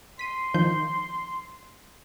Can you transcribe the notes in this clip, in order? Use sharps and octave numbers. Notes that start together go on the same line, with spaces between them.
C6 B6 D#7
D#3 F3 G6